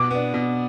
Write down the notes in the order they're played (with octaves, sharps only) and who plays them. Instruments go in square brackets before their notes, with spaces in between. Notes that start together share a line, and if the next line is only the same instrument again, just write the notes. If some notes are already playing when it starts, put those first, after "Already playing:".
Already playing: [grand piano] B2 [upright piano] D6
[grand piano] B3 D4
B2